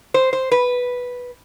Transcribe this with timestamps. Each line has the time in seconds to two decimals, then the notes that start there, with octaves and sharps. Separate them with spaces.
0.14 C5
0.33 C5
0.51 B4